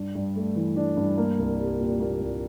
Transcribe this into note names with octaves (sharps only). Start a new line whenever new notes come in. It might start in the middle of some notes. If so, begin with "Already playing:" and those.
Already playing: G2 D4
G2
A3
E3
D4
G2
A#3
C2
G3
A#2
A#3
C2